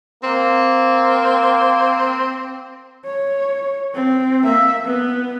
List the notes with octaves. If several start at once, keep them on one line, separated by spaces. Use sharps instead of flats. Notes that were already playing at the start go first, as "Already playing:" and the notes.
A#3 C4
C#5
C4
A#3 E5
B3